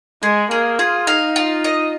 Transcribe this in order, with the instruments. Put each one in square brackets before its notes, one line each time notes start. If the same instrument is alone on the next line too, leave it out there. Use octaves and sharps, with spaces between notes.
[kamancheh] G#3 [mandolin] G#4
[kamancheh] A#3 [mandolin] G#4
[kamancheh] F4 [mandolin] G#4
[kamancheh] D#4 [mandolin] F5
[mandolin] F4
D#5